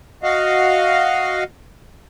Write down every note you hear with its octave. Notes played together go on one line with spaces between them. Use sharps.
F#4 D#5 F5